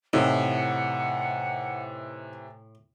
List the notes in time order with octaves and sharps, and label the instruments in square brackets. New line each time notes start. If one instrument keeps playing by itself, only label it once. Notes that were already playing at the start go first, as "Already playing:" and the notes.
[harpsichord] A2 [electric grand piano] C3 E3 [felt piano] D#4 [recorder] F#5